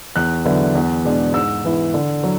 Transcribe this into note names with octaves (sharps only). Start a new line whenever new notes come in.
E2 F#6
D3 F#3 B3 E4
E2
B2 G#3 D4
G#2 E6
E3 B3 E4
D3
F#3